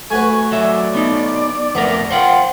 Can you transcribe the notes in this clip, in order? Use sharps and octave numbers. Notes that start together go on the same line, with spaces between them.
A3 F#4 B4 G#5
F#3 D5 E5
B3 D#4
F2 A3 B3 A#4
F4 C5 F#5 G5